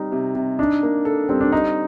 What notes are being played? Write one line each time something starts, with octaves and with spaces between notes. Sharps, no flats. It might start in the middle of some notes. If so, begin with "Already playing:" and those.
Already playing: G3 C4 D#4
C3
C3
D4 D#4
A#3
A4
G3 C4
D4
C4 D#4